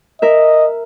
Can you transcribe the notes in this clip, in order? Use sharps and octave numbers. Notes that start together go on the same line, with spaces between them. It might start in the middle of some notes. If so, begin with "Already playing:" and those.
A#4 D#5 E5